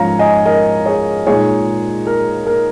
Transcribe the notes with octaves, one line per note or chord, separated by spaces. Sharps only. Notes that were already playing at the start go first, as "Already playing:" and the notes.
Already playing: G#2 F3 C#4 C#5 F5 A#5
D#5 G#5
A#4 D#5
G#4 C#5
A#2 G#3 D#4 G#4 C#5
A#4
A#4